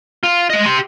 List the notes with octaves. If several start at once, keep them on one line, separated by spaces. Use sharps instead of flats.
F4
G#3 D#5
G4 C6